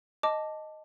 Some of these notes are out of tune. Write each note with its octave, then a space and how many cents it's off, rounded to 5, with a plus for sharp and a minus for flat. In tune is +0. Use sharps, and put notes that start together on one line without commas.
D#5 +0 A5 +0 D6 +0